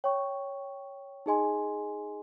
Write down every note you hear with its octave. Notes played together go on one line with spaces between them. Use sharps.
C#5 G5 C#6
D#4 G#4 D#5 G#5 C6